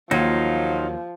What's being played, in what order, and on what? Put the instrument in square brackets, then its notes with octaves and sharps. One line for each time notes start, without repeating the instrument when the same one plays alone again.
[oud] D#2 [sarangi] F3 [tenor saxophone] F#3 [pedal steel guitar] D#4 F4